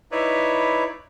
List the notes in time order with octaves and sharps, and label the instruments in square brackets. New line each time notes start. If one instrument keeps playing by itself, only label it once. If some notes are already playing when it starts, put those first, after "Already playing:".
[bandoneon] D#4 E4 B4 C#5 D5 E5